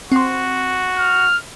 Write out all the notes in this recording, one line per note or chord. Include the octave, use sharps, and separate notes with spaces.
C4 F#4 C6
F6